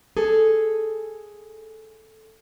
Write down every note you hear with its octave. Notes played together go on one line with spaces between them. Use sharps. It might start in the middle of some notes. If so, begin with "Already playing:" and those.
G#4 A4